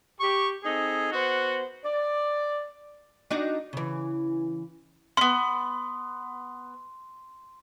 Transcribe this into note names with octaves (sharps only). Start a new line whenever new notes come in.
G4 C#6
C4 D#4 G#4 A4
B3 F#4 C5 F#5
D5
D4 D#4 F#4
C#3 E3
B3 C#4 C6